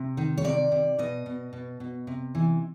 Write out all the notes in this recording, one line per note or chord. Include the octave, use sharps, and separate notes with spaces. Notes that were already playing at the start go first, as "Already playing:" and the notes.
Already playing: C3
D#3
C#5
C3 D5
C3
B2 D#5
B2
B2
B2
C3
E3